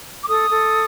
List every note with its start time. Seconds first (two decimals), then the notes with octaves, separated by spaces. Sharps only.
0.23 D6
0.28 A4 D#6
0.51 A4